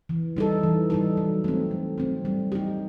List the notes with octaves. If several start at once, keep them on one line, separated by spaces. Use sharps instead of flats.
E3
G3 D#4 A4
E3
G3 D#4 A4
F#3
A3 C4
F#3
A3 C4
G3
D#4 G4